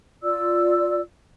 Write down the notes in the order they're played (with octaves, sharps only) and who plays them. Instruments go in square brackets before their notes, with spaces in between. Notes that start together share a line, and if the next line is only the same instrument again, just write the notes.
[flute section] F4 D5 E6